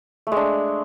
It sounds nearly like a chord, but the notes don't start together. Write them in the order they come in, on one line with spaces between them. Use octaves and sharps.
A3 G#3 D4